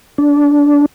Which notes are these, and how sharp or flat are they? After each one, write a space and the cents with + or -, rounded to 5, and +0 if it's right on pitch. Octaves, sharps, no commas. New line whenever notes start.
D4 -20